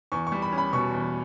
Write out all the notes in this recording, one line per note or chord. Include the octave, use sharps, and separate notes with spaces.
E2 C#6
C#6
G3
B5
C#4
B5
B2 C#6
E2